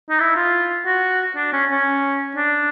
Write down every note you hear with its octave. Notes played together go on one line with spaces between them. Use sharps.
D#4
E4
F4
F#4
D4
C#4
C#4
D4